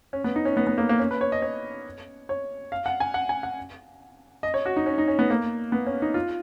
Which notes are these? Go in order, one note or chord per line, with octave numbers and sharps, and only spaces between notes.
C#4
B3
D#4
C#4
B3
B3
A#3
A#3
C#4
B4
C#5
D#5
C#5
C#5
F5
F#5
G#5
F#5
G#5
F#5
D#5
C#5
F#4
D#4
C#4
D#4
C#4
B3
A#3
B3
C#4
D#4
F4